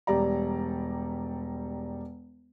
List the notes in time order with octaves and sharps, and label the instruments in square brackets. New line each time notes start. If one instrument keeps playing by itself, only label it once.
[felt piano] E1 G3 G4 D5 A#5